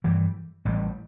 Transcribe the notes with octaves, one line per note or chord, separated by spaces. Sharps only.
G2 E3 G3
A1 A2 G3